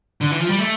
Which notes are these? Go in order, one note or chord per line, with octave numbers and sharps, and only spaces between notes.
D3
E3
F3
G3
A3